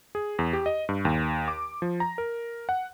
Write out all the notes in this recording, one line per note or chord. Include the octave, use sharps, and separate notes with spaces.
G#4
E2
G4
D#5
G2
D#2
D6
F3
A#5
A#4
F#5